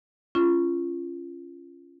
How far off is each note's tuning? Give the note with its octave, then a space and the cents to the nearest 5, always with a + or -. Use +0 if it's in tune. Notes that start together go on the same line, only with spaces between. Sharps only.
C#4 +0 F4 -25